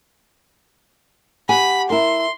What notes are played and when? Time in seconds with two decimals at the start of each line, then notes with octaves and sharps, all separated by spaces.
1.49 G4 F#5 G#5 B5
1.90 E4 A#4 C6